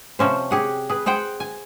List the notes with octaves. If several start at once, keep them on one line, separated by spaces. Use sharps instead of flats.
C3 F3 C#4 C5
G4 G#4 F#5
G#4 B4
G#4 C5 F#5 G5
G#5